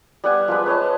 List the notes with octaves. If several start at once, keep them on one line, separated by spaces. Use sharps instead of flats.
G3 B3 F#5 G#5
F3 G#3 B4
B4 C#5 D#5 A5